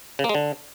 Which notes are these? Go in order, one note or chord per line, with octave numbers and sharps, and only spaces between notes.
C#3
A#3
G#3
D3